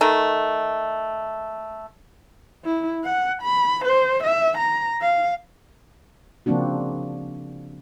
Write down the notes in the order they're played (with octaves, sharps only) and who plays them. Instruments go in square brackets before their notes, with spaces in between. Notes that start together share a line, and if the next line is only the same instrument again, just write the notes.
[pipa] D#3 A3
[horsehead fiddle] E4
F#5
B5
C5
E5
A#5
F5
[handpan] C#3 F3 A#3 C4 D4 F#4